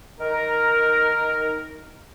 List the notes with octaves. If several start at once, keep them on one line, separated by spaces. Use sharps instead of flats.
D#3 D#4 A#4